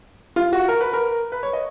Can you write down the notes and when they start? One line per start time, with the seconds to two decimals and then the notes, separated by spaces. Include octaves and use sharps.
0.36 F4
0.53 F#4
0.68 A#4
0.81 B4
0.93 A#4
1.32 B4
1.43 C#5
1.53 D#5